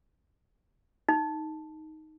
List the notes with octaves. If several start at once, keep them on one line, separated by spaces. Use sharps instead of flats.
D#4